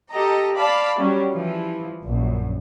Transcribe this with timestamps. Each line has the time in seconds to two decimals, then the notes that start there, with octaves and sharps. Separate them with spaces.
0.11 G4 A4 D#5 A#5
0.55 D5 F5 A5 B5
0.98 F#3 G3 C#4
1.32 E3 F3
2.04 A#1 F#2